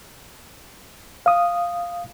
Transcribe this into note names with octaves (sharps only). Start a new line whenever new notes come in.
F5 D#6